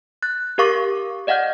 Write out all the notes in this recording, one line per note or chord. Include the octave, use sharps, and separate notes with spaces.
F#6 A6
G4 A#4 F5 C#6 D6 A6
D5 D#5 F5 F#5 F6 G6